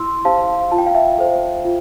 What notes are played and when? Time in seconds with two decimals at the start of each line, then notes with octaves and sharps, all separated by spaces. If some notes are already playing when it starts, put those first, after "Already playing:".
Already playing: E4 C6 E6
0.25 G4 C5 F5 A5
0.71 F4 A5
0.78 G5
0.86 F5
0.94 E5 G5
1.18 A4 C5
1.65 F4